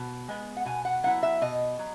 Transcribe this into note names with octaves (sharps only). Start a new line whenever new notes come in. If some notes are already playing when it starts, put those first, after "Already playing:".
Already playing: B2
G#3 B3
F#5
B2 G#5
F#5
F#3 B3 E4 F#5
E5
B2 D#5
F#3